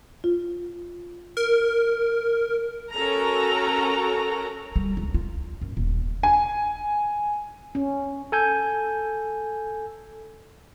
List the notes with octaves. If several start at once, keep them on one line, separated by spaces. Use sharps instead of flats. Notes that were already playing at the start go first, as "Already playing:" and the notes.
F4
A#4
C#4 F#4 A4 A#4 A#5
G3
C#2
F4
F#2
D#1
G#5
C#4
A4 G#5 G6